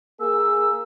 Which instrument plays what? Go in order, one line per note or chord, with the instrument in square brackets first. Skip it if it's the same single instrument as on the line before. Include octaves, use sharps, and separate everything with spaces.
[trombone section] A#3 G#4 A#4 [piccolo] E6